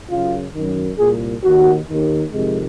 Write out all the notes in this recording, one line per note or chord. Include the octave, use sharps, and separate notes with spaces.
F#2 C#3 F4
F#2 D#3
C2 A#2 G#4
D#2 D#3 F#4
D#2 D#3
F2 C3 D#3 G#3